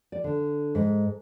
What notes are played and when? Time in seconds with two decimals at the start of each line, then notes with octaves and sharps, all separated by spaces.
0.12 D5
0.24 D3
0.75 G#2